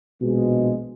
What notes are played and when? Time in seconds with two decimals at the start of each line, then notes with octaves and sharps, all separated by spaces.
0.22 A#1 B2 F3 G#3